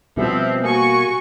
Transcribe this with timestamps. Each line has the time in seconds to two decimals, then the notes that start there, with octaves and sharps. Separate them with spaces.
0.17 B2 F3 G3 C4 E5
0.62 A#3 F#4 G#5 C#6